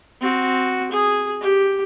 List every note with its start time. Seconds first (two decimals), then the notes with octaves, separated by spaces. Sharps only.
0.21 C4 F#4
0.91 G#4
1.41 G4